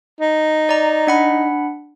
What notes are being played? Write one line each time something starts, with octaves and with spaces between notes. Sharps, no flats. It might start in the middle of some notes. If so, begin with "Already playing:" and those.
D#4
D5 A#5
D4 F#5 B5